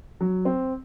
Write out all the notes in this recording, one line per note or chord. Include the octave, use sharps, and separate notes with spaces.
F#3
C4